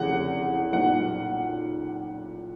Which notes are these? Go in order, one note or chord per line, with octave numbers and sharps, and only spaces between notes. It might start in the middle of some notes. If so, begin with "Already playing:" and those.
Already playing: F1 E2 C#3 F#5
B1 A#2 G3 F#5